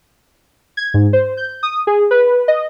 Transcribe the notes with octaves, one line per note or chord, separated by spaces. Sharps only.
G#6
G#2
C5
G6
D#6
G#4
B4
D#5